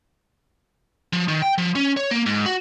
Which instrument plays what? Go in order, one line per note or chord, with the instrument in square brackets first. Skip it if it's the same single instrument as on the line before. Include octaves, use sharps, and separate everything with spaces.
[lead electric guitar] F3
D#3
G5
F3
C#4
C#5
A#3
G#2
F#4